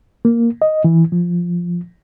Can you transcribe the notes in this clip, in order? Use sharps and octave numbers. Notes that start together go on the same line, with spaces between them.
A#3
D#5
E3
F3